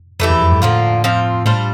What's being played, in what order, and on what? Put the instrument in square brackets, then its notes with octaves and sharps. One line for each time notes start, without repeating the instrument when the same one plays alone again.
[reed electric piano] F2 [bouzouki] E3 A3 E4 G4
[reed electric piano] E2
F2
G2
[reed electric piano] A2 [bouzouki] D3 F3 A#3 F4
[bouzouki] F3 C4 F4
[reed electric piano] A2 [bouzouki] G3 D4 F4 C5